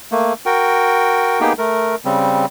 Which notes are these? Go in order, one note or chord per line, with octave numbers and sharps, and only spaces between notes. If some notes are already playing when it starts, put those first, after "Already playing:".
A3 A#3
F#4 A#4 G5
A#3 B3 D#4 G4 G#4 G5
A3 A#4
C#3 G3 C4